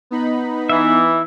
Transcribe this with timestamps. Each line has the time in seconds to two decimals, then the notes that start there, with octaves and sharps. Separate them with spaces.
0.11 B3 D#4 B5
0.69 E3 E4 E5